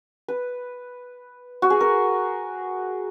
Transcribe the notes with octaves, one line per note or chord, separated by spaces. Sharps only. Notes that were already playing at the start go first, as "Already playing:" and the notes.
B4
F#4
G#4
A#4